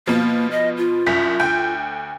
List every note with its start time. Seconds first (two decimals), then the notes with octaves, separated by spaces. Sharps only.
0.07 B2 F3 A#3
0.51 D#5
0.77 F4
1.06 C2 F#2 B6
1.40 D2 G5